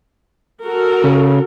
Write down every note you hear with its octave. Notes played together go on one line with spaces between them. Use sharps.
F#4 A4 A#4
C#3